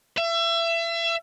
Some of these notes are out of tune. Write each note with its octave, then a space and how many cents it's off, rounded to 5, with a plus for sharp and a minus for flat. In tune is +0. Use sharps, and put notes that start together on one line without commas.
E5 +30